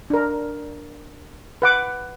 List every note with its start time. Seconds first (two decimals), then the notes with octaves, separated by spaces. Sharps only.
0.10 D4 A#4
1.62 B4 F#5 D6